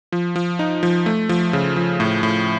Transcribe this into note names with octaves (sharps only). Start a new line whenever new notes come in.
F3
F3
D#4
F3
A3
F3
C#3
F3
A2
A2